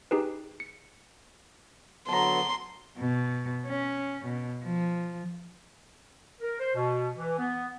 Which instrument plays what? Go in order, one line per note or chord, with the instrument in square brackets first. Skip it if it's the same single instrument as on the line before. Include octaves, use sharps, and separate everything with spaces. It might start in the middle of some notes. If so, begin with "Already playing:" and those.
[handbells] D#4 G4 G#4 B4
C#7
[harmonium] D3 F#3 B3 [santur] A5 A#5 [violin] C6
[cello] B2
C#4
B2
F3
[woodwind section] A#4
C5
B2
E3
B3